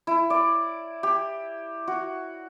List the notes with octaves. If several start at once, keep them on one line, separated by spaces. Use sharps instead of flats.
E4
D5
G4
F#4